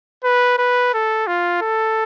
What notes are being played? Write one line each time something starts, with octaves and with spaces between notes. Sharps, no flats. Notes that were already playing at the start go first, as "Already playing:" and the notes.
B4
B4
A4
F4
A4